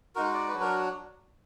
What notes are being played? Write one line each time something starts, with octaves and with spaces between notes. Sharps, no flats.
G#3 D#4 F#4 A#4
D5
B4
F#3 D4 F#4
A#4